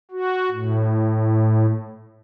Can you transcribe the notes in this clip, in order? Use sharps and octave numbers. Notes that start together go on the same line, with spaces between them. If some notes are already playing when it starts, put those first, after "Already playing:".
F#4
A2